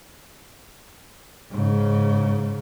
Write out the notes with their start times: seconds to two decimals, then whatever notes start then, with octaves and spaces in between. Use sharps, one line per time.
1.51 G#2 C#3